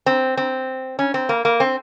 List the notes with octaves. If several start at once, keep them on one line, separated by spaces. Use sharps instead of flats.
C4
C4
C#4
C4
A#3
A#3
C4